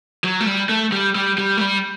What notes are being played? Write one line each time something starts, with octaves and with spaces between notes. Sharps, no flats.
F#3
A3
G3
A3
G3
G3
G3
A3
G3